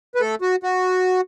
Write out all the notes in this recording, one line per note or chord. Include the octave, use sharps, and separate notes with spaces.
B4
A3 A4
F#4
F#4